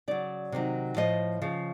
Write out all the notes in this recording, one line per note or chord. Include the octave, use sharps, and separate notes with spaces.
C#3 F#3 D5
C3 D#3 F#3
A2 F3 D#5
C#3 F3